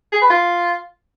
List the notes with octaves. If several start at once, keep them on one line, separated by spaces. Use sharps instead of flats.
G#4
B4
F4